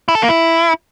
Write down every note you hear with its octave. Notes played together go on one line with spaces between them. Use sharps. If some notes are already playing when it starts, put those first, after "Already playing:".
E4
A4
A#3
E4